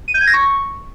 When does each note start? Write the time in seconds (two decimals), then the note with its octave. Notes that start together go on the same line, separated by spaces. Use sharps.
0.08 D#7
0.14 G6
0.21 G#6
0.27 A#6
0.34 C#6